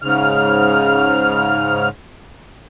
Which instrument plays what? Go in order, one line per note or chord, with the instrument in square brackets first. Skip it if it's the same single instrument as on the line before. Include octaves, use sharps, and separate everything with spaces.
[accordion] G#2 C#3 F6